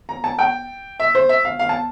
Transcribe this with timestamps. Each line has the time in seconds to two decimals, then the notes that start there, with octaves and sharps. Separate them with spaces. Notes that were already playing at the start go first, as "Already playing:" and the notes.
0.09 A#5
0.24 A5
0.39 G5
1.00 E5
1.15 C5
1.29 E5
1.45 F5
1.59 F5
1.69 A5